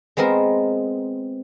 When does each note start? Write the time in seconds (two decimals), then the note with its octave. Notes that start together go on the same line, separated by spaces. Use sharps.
0.17 G#3 B3 C4 A#4